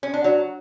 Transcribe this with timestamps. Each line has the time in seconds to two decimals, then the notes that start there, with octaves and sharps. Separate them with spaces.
0.03 C#4
0.14 D4
0.24 F#3